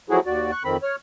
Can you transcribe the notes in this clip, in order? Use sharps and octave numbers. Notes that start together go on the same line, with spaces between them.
F3 F#3 A3 E4 F#4 G#4
D#2 F#4 D5
C#6 F#6
F2 D#3 C4 B5
C#5 F6